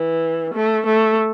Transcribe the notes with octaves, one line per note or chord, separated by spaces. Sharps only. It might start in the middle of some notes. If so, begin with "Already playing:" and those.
Already playing: E3
A3
A3